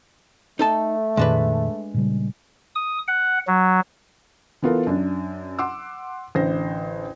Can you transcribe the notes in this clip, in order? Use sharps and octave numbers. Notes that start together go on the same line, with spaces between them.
A3 D#4 A4 A5
F2 A#2 D#3 G#3 D4 B4
A#2 C#3 G3
D#6
F#5
F#3
E3 B3 F4 A4 A#4
F#2 D4
F#5 C6 D6 E6
A1 D3 C5 A#6